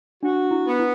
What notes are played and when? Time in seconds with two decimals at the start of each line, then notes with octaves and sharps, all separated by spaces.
0.22 D4 F#4
0.51 E4
0.66 B3
0.79 E4